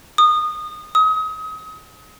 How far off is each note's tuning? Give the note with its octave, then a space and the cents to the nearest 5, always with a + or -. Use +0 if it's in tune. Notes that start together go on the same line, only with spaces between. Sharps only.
D#6 -20
D#6 +30